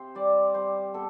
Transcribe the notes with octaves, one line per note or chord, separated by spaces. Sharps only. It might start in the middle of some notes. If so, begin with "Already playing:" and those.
Already playing: C3 C5
G3 D5
G3 C5
B2 A4